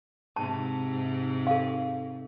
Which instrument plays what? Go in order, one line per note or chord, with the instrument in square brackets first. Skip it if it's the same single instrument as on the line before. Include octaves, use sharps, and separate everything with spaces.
[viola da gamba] G#2 C3 [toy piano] A5
[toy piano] A4 F5